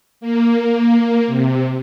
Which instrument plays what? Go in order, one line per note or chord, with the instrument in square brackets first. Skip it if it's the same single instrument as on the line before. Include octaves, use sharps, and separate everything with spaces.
[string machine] A#3
C3